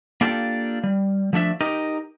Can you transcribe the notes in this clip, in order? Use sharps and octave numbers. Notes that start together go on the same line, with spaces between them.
A#3 D4 F4 G4 A4
G3
F3 A3 D4 E5
D#4 G4 A#4 D#5